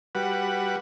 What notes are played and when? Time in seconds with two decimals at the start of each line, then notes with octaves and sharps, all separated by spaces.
0.15 G3 F#4 B4 F#5